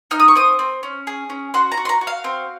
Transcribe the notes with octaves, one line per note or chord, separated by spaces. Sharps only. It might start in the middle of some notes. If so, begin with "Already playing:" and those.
D#4 F6
D#6
C#6
C4 D#6
C4
C#4
G#4
C#4
F#4 C6
A#5
F#4
C6
A#5
F#4
F5
C4